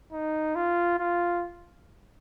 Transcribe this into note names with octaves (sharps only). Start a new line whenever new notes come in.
D#4
F4
F4